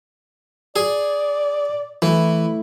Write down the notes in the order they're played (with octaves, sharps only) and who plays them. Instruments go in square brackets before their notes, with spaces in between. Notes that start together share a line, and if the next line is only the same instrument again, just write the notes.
[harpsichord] G#4 [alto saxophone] D5
[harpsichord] E3 [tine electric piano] A3 E4